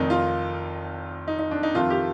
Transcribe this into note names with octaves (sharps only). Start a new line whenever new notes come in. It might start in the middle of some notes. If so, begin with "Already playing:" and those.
Already playing: F1 F2 D#3 D#4
F4
D#4
D#4
D4
D#4
F2 D#3 A3 F4
G4